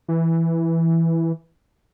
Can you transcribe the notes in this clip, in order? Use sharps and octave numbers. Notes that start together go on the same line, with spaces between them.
E3